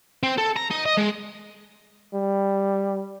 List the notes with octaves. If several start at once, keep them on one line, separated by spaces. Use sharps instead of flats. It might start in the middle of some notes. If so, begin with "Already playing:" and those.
C4
A4
A#5
D#4
D#5
G#3
G3